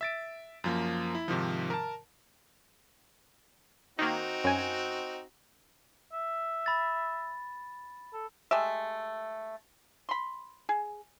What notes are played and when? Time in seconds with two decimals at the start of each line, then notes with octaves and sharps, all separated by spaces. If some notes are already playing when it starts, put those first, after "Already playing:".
0.01 E5 A6 D7
0.64 F#2 F3 A#3
1.15 E4
1.28 G#2 C3 D#3 F3
1.70 A#4 A5
3.99 D#3 A#3 C4 D#4 F#4
4.44 F#2 G#5
6.13 E5
6.66 B5 A6
8.13 A4
8.51 G#3 A3 G4 E5
10.09 B5 C6
10.69 G#4